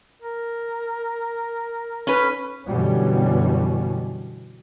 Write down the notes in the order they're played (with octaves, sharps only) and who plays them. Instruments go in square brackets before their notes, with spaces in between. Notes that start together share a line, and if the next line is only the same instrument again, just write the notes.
[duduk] A#4
[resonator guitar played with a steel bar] C#4 B4
[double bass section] F#2 B2 D3 E3 G3 C#4